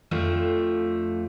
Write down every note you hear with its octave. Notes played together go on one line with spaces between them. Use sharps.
F2 F3 A3 D4